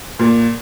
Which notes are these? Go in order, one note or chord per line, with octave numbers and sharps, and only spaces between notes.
A#2